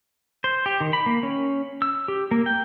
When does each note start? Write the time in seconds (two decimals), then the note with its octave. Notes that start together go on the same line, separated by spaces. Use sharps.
0.44 C5
0.66 G4
0.81 D#3
0.93 B5
1.06 A#3
1.23 C#4
1.82 E6
2.08 G4
2.31 A#3
2.46 G5